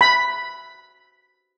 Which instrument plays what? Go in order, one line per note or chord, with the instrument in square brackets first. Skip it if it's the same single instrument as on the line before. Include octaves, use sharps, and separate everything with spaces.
[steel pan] B5